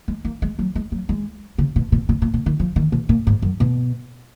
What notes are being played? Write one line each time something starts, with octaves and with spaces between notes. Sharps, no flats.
G#3
A#3
G#3
F#3
G#3
F#3
G#3
C#3
B2
B2
B2
A#2
B2
D#3
F3
D#3
B2
A#2
G#2
F#2
B2